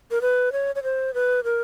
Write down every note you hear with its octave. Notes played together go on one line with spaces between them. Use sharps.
A#4
B4
C#5
C#5
C5
B4
A#4